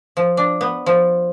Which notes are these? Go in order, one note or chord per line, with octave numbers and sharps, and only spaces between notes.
F3
D4
B3
F3